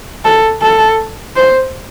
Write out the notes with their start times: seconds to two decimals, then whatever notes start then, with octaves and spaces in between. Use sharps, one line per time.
0.25 A4
0.62 A4
1.36 C5